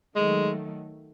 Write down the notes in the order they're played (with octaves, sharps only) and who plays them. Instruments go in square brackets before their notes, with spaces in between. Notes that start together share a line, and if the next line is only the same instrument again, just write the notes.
[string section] D#3 F#3 A3 [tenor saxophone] G#3